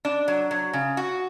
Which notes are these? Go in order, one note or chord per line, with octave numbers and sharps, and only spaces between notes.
D4
F#3
F#3
C#3
F#4